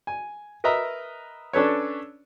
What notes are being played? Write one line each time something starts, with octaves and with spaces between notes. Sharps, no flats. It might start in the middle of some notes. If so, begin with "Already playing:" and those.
G#5
A#4 B4 D#5 E5 A#5
C#4 D4 A4 B4 C#5